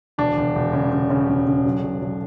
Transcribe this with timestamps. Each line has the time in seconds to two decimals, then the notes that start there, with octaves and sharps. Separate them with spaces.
0.18 E1 D4
0.37 E1
0.55 E1
0.73 C#3
0.92 C#3
1.10 C#3
1.28 E1
1.47 C#3
1.65 B1
1.83 B1
2.02 B1